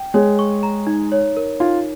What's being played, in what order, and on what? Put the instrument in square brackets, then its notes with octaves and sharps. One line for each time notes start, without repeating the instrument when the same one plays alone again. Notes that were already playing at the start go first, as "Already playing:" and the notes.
Already playing: [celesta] G5
[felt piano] G#3 G#4 [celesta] C#5
[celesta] C#6
A#5
D#4
C#5
A#4
[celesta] D#4 [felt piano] F4